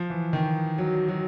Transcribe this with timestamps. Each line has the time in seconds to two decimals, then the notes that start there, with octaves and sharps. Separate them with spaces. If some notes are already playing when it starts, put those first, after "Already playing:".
Already playing: F3
0.10 E3
0.33 D#3
0.78 F#3
1.08 F#3